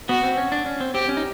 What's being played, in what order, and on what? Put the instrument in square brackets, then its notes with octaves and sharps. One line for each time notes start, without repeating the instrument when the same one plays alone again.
[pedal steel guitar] B3 [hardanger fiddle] F#4
[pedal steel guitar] C4
C#4
D4
C#4
C4
[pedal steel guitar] C4 [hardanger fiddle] G4
[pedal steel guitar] C#4
D#4